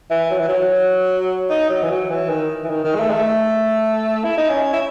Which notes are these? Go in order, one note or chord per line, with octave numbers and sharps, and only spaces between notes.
E3
F#3
E3
F#3
D#4
F#3
E3
F#3
E3
D#3
E3
D#3
D#3
G#3
A3
G#3
A3
E4
D#4
C#4
E4